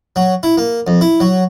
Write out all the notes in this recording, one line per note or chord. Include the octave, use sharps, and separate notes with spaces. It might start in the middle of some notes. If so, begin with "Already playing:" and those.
F#3
E4
A#3
F2
E4
F#3